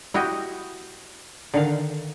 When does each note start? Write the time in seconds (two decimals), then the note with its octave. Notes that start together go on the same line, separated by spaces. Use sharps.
0.14 E4 F#4 G4 D#5
1.54 D3 D#3 F5